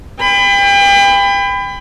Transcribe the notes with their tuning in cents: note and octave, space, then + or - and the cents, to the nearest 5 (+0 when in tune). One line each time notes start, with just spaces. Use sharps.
G5 +35 B5 +25